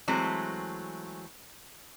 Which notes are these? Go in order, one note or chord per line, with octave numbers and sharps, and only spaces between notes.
E3 F#3 G#3 A3 C4